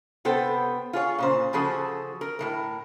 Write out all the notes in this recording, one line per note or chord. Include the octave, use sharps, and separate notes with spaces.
C3 B3 A4 C5 G5
F4 G#4 C#5
A#2 C#3 C5
C#3 F3 F#4 G#4 A4
A#4
A2 F3 A#4